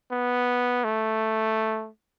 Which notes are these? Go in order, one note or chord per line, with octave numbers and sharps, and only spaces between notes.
B3
A3